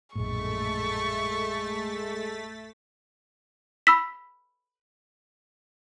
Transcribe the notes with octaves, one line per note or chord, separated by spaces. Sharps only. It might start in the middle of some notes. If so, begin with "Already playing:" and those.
A#1 F#2 A2 G#3 A3 C#6 A6 B6
B5 E6 B6